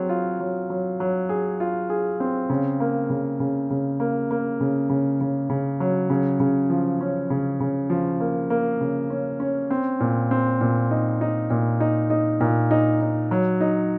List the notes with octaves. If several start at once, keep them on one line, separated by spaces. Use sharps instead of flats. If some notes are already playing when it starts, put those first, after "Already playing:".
Already playing: F#3 C4 G#4
F4
F#3
F#3
F#3
G#4
F4
G#4
C4
C#3
A#3
C#3
C#3
C#3
A#3
A#3
C#3
C#3
C#3
C#3
F#3
C#3
C#3
F3
C#4
C#3
C#3
F3
A#3
A#3
C#3
C#4
C#4
C4
A#2
C4
A#2
D#4
D#4
A#2
D#4
D#4
A#2
D#4
D#4
F#3
D#4